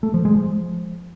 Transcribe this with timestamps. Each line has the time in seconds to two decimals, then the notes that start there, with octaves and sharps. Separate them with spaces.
0.03 A3
0.14 F3
0.25 G#3
0.36 F3